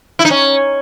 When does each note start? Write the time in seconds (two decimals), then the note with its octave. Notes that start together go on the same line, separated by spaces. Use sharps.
0.19 E4
0.25 D#4
0.30 C#4